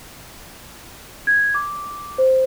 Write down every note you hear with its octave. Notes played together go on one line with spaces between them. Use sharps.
G#6
D6
C5